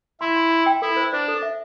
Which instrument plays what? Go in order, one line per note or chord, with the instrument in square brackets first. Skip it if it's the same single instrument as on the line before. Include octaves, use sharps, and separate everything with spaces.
[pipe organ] E4 [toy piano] C6
[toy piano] C6
C6
G5
[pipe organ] E4 [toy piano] A4
[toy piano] C5
[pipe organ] D4 [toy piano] C5
[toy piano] A4
E5